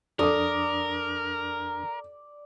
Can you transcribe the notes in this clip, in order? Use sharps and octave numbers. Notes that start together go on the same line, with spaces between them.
F2 D4 A4 A#4 D5 D6 D#6